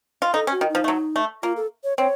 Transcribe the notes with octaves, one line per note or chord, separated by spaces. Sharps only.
F4
D#4 A4
C#4
F#4
D#3
D#4
F3
A3
F#3
A3
A#3 F4
A4
C#5
C4 C#5